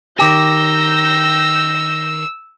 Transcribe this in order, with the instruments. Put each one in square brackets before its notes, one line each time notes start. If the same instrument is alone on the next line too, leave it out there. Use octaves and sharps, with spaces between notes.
[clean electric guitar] D#3 G4 [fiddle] E6 [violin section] G6 A#6